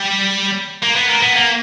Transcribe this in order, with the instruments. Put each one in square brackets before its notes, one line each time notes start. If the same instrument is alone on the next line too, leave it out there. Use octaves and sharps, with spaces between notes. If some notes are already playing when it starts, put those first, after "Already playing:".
Already playing: [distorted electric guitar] G3
A#3
B3
A#3
B3
A#3